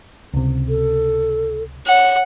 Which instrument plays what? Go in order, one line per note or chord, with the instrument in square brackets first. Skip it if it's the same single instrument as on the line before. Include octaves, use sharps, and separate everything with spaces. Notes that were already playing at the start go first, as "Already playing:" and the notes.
[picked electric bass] C#2 C3
[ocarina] A4
[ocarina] C#5 [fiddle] F#5